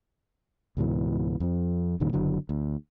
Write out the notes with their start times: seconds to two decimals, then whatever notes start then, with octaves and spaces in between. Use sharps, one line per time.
0.77 C#2 G#2 B2 E3
1.40 F2 F3
2.00 F1 G2 A#2 D#3
2.13 F#1 D3 F#3
2.49 D2